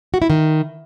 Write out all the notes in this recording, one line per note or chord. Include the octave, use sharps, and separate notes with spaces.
F#4
E4
D#3